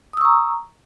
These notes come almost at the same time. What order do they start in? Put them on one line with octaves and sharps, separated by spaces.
D#6 E6 C#6 A#5